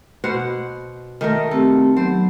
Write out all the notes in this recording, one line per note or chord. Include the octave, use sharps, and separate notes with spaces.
B2 C5 F#5
D#3 A3 A#4
A3 C4 G4 A4
F#3 B3 C5